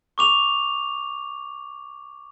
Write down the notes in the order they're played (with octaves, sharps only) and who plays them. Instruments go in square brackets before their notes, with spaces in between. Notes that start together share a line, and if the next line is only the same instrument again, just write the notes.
[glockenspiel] C#6 D6 F7